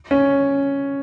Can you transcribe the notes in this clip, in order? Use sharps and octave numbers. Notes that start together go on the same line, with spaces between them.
C#4